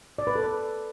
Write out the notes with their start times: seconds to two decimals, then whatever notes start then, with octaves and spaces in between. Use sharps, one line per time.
0.18 D5
0.27 B4
0.35 A4
0.44 B4